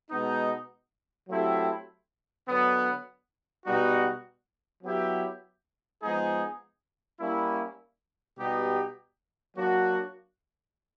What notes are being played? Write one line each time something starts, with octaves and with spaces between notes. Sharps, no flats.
B2 G#3 B3 D#4
F#3 A3 C4 E4 G4
D3 F#3 B3
B2 G3 B3 D#4 F#4
F#3 B3 E4 G4
F3 G#3 B3 D#4 G#4
G3 A#3 C#4 E4
B2 G3 B3 D#4 G4
F#3 A#3 D4 F#4